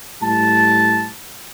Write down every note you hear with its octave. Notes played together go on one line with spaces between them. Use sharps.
A2 G3 A5